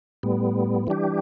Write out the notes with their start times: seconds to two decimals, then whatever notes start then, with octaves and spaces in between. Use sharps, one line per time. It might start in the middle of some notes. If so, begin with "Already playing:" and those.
0.23 A2 G3 B3
0.87 E3 G3 D4 G4